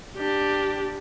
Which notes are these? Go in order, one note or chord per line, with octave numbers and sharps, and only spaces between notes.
D4 G4